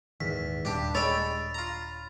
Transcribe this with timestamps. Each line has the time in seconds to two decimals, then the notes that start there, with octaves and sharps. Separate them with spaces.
0.21 D#1 E2 G#2 D#3 B6
0.65 D#1 G2 G3 D4 G4
0.95 G#3 A4 C#5 G5 B5 A6 F7
1.54 F4 A#5